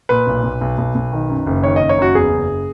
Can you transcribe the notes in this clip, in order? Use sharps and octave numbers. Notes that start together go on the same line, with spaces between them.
A#2 B4
B1
B1
B1
B1
B1
D#3
F#2
F#1
D#3 C#5
F#1 D#5
C#5
F#2 F#4
E2 G#4
F#1